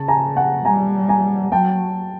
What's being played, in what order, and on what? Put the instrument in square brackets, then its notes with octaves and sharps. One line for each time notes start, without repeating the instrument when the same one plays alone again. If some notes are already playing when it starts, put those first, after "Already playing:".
Already playing: [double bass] C#3 [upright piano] A5
[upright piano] G#5 A#5
F#5 G#5
[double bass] G3 [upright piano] G#5 A#5
[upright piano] G#5 A#5
[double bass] F#3 [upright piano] G5 A5